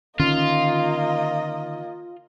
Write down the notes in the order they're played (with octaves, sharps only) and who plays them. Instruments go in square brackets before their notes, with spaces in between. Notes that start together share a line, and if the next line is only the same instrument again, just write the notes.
[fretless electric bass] D3 D#3 C#4 [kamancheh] A#3 D#5 [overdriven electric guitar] F4